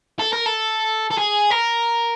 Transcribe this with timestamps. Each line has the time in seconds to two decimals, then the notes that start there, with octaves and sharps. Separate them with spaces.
0.19 A4
0.33 A#4
0.46 A4
1.11 A4
1.18 G#4
1.50 A#4